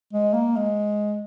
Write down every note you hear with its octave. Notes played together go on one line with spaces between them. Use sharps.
G#3
A#3
G#3